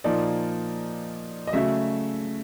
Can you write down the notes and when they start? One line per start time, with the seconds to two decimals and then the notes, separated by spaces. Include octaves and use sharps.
0.04 A#2 F3 A#3 D#4 D5
1.47 D#5
1.53 C#3 F#3 A3 E5